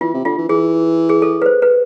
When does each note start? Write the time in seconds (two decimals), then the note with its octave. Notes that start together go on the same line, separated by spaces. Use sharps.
0.01 E3 F4
0.14 C3
0.25 D3 F4
0.38 E3
0.49 E3 G#4
1.09 G#4
1.22 A4
1.42 B4
1.46 C5
1.62 B4